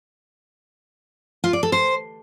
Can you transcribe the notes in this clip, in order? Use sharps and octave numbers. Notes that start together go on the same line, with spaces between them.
F4
D5
A4
C5